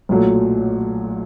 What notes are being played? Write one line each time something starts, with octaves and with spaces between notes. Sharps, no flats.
B1 A#2 F#3 A3